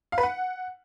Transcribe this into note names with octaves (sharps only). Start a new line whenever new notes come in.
F5
B4
F#5